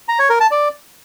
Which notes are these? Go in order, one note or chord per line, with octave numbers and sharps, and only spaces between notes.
A#5
C#5
A#4
A5
D5